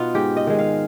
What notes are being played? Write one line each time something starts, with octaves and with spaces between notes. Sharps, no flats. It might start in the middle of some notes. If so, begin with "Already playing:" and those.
Already playing: B2 B3 D#4 F4
G#2 G4
D#5
D#3 G#3
F5